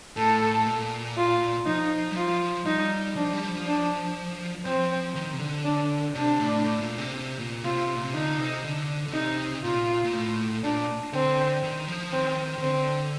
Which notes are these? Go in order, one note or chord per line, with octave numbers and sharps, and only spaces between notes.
A2 A4
A2
A#2
F4
F3 D#4
G3
F3 F4
G3 D#4
F3 D4
G3
F3
D4
F3 C4
D#3
C3
D3
D4
C3 D4
A2
A2
A#2
C3
C3
A#2
C3 F4
A#2
C3
D3 D#4
C3
D3
D3
C3 D#4
A#2 F4
A#2
A2
A#2 D4
D3 C4
D#3
F3
D#3 C4
D#3
D3 C4